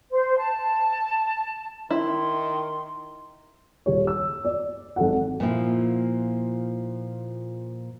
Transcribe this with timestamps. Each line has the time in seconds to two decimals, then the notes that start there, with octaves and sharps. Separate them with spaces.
0.11 C5
0.37 A5
1.91 D#3 E4 C6
3.86 D#1 G3 C#5
4.07 E6
4.45 D5
4.96 G#1 A4 F#5
5.40 A#2 F3 E4